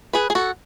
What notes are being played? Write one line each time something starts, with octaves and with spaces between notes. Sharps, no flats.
G#4 B4
G#4
F#4 A4